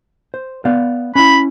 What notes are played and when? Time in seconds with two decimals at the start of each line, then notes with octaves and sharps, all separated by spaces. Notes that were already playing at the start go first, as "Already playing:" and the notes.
0.34 C5
0.65 B3 D5 F5
1.15 C#4 E4 B5